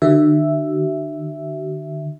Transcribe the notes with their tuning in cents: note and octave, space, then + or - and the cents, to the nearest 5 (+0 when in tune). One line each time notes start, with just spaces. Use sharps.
D3 +45 F#4 +35 E5 +0